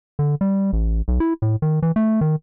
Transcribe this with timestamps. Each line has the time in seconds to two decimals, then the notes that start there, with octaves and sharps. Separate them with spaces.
0.19 D3
0.41 G3
0.73 A1
1.08 B1
1.20 E4
1.42 A2
1.62 D#3
1.83 E3
1.96 A3
2.21 D#3